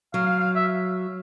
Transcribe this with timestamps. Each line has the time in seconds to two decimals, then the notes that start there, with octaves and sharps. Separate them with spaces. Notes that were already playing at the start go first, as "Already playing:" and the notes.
0.14 F#3 F5
0.26 F5
0.40 F5
0.55 E5